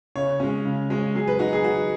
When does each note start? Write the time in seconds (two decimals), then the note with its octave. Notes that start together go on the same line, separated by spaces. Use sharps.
0.16 C#3 C#5
0.40 G#3 C#4
0.65 C#3
0.90 G#3 C#4
1.15 F#3 G#4
1.28 B4
1.39 D#4 F#4
1.53 G#4
1.64 F#3 F#4